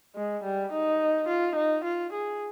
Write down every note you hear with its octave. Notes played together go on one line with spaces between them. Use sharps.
G#3
G3
D#4
F4
D#4
F4
G#4